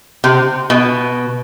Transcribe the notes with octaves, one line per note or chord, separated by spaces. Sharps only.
C3
B2